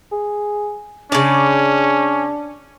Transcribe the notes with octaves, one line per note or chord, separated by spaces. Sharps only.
G#4
C#3 C#4 D4 D5